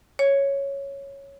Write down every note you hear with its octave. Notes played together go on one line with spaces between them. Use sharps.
C#5